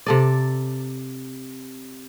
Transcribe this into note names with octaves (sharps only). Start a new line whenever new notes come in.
C3 A4 D5